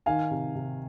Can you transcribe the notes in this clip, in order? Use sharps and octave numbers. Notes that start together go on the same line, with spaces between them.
D#3 F5 G#5
C3
C3